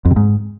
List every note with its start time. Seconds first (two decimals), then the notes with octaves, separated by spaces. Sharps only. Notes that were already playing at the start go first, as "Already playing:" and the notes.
0.05 F2
0.11 C3
0.16 G#2